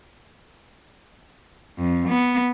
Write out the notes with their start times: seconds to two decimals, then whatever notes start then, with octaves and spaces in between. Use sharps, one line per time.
1.79 F2
2.08 B3